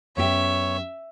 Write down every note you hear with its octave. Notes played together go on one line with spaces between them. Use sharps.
F#2 B3 G4 C#5 E5